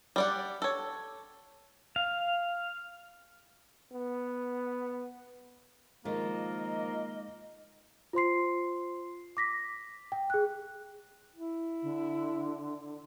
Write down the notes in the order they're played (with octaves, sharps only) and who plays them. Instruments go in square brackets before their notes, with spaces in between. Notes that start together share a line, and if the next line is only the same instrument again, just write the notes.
[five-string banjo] G3 D5 F#5
A4 C#5
[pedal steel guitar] F5
[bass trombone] B3
[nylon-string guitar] D#3 F3 F4 [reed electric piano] G#3 D#4 [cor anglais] A#3 [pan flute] D#5
[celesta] F4 C5 C6 C7
D6 A#6 B6
G5
G#4 F#6
[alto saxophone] E4
[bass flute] D3